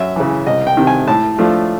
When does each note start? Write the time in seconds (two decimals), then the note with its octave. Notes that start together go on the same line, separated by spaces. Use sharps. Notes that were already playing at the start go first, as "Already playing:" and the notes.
Already playing: F#2 E5
0.16 C#3 E3
0.46 C2 D#5
0.67 G5
0.77 C3 D#3
0.87 G#5
1.08 A2 A5
1.38 F3 A3 D4 F4